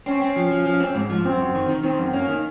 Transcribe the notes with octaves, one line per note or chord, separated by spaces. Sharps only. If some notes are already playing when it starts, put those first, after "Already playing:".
C4 C#4
C4
F3
F3
F3
C4
G#2
F3
F#2 C4
F#2
D#3
D#3
D#3 C4
F#2
A#3 C#4
D#3